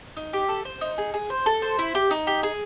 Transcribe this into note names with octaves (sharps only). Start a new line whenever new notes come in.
D#4
G4
A4
C5
D#4
G#4
G#4
C5
A4
C5
E4
G4
D#4
G4
G#4